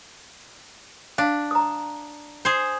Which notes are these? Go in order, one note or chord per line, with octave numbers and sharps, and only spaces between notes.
D4 F5
A#5 D#6
G#4 C5